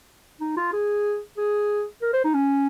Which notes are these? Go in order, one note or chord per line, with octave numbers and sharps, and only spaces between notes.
D#4
F4
G#4
G#4
A#4
C5
D#4
C#4